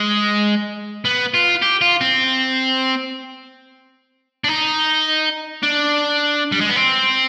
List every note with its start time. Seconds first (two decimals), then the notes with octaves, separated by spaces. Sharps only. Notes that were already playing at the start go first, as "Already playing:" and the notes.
Already playing: G#3
1.05 B3
1.34 F4
1.62 G4
1.81 F4
2.01 C4
4.44 D4
4.48 D#4
5.63 D4
6.52 G3
6.61 G#3
6.69 B3
6.76 C4